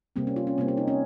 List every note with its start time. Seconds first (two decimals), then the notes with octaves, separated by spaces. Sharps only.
0.16 C3 G3 A#3 C4
0.27 C#4
0.36 F4
0.47 C#4
0.58 C3 G3 A#3 C4
0.68 C#4
0.77 D#4
0.88 C#4